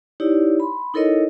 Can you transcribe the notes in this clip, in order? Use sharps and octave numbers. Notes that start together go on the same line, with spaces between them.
D#4 E4 G4 C#5 D5
B5 C6
D#4 E4 A4 A#4 C#5 D#5